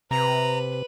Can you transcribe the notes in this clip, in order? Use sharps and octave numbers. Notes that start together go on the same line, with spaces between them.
C3 B4 A#5